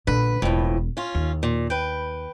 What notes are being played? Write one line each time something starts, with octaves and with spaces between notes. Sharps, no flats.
A#1 D3 B4
E1 F2 A2
C#4 F4
D#2
A#2
B4 G5